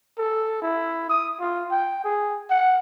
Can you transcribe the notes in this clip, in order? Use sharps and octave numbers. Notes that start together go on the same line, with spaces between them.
A4
E4
D#6
F4
G5
G#4
F#5